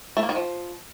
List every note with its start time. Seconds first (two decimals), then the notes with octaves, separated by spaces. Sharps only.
0.17 A3
0.23 A#3
0.29 D#3
0.35 F3